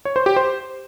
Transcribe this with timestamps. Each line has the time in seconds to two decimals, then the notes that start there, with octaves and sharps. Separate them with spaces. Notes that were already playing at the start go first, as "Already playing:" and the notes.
0.05 C#5
0.16 C5
0.26 G4
0.36 C5